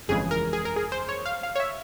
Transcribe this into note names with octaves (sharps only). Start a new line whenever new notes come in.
G1 F2 C#3 E3 G#3 G#4
A#4
G#4
A#4
G#4
C5
C#5
F5
F5
C#5
E5